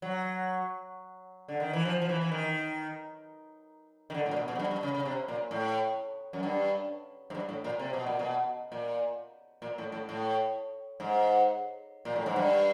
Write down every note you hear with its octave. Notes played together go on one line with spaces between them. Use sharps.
F#3
D3
D#3
E3
F3
F3
E3
E3
D#3
D#3
D3
A2
A#2
B2
B2
G#2
G2
G2
C#3
C#3
C3
A#2
A2
F#2
G2
G#2
G2
A2
A#2
C3
B2
A#2
B2
A#2
A#2
A2
A2
A2
G#2
A#2
A2
G#2
G2